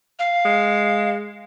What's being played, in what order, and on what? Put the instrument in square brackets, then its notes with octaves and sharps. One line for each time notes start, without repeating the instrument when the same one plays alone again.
[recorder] F5
[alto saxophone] G#3